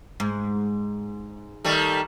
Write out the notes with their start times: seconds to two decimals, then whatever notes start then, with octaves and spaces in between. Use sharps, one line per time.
0.20 G#2
1.64 D#3 G3 A3